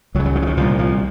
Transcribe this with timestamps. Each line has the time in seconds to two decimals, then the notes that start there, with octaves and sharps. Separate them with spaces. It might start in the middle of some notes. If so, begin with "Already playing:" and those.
0.15 C#2 F#3
0.20 C#3
0.26 F#3
0.35 D#3
0.42 F3
0.47 D#3
0.57 C2 A#2 F3
0.78 F3